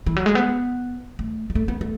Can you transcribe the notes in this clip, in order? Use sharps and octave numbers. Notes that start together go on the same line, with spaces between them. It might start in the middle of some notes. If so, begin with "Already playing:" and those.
E3
F#3
G#3
B3
A3
G#3
A3
B3
A3